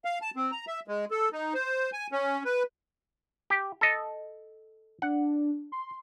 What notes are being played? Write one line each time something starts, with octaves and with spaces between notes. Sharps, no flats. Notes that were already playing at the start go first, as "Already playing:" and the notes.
F5
A5
C4
A#5
E5
G#3
A4
D#4
C5
G#5
C#4
B4
G4
A4 D#5
D4 F#5
C6